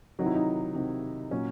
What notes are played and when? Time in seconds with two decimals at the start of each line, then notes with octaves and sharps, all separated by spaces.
0.19 C3 D#3 F#3 D#4
0.26 E4
0.35 D#4
0.75 C3 D#3 F#3
1.31 A#2 F#3 C#4